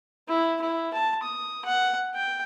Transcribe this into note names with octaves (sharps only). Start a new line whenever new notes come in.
E4
E4
A5
D#6
F#5
G5